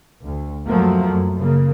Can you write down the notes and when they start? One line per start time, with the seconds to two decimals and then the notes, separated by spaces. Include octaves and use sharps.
0.23 D2
0.67 F#2 F3 F#3 A3 A#3
1.08 F#2
1.39 C#3 A#3